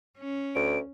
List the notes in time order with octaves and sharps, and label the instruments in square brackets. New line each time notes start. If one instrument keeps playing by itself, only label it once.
[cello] C#4
[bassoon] D2 [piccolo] D7